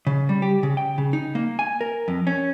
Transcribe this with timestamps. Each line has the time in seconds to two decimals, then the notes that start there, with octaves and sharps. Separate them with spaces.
0.07 C#3
0.29 G3
0.42 G4
0.63 C#3
0.77 G5
0.98 C#3
1.13 D#4
1.35 A#3
1.59 G#5
1.81 A#4
2.08 F2
2.27 C#4